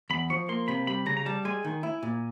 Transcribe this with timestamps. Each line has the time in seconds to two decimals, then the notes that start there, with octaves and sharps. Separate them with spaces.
0.10 E2 B5
0.30 F3 C#6
0.49 A#3 C6
0.68 C3 B5
0.87 G3 B5
1.06 C#3 A#5
1.17 A#5
1.25 G3 A5
1.45 G#3 G#5
1.65 D#3
1.83 E4
2.03 A#2